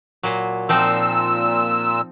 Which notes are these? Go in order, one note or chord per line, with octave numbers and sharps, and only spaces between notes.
A#2 F#3
A#2 F3 C4 D#4 E6